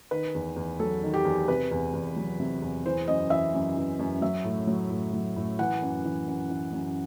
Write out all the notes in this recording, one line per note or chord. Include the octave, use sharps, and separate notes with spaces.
D#3 B4
E2
E2
F#3 A4
D#3
G4
E2
C3 B4
E2
E2
F#3
C3
E2
E3 C5
F#2 D#5
E3 E5
F#2
E3
F#2
F#3 E5
A2
F#3
A2
F#3
A2
E3 F#5
F#2
E3
F#2
E3
F#2